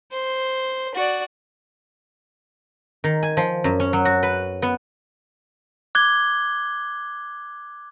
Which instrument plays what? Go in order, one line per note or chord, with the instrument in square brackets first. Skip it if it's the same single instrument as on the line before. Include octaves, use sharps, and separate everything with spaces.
[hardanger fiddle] C5
F#4 D5
[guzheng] D#3
G#5
F3
F#2
C#4
F#3
F#4
B4
B3
[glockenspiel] D6 F#6 G#6 G7